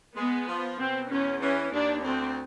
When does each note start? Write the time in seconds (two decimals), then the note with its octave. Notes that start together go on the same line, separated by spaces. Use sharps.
0.17 G#3 B3
0.47 F3
0.78 B2 C4
1.10 E2 C#4
1.41 E3 C#4
1.73 D#2 D4
2.03 D2 C4